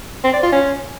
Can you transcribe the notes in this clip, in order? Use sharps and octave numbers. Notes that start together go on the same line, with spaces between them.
C4
D5
F4
C#4